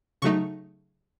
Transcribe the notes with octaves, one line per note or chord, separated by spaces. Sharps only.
C#3 F#3 A3 D#4 C#6